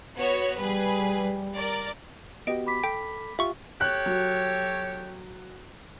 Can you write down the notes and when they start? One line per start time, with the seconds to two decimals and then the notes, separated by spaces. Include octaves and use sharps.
0.16 B3 F#4 C#5
0.57 G3 G#4 B4
1.56 A#4 D5
2.47 B3 F#4 G4 D#5 D7
2.66 B5 D6 B6
2.84 A4 G5
3.39 F4 G4 E5 C#6
3.81 G4 A4 C#5 F#6
4.06 F#3